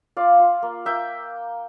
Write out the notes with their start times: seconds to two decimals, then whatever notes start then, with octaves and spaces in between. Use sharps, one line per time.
0.17 F4 D5 F5
0.39 F4
0.63 A#3
0.85 A#3 E5 G5